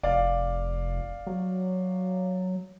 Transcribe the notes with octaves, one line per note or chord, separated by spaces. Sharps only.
F1 D5 F5
F#3